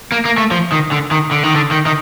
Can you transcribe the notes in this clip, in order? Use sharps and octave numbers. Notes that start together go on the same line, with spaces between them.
A#3
A#3
A3
F3
D#3
D3
D#3
D3
D#3
D3
D#3
D#3